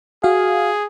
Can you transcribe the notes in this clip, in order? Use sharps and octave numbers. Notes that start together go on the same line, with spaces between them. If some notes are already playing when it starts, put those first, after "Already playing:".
F#4 G#4 F5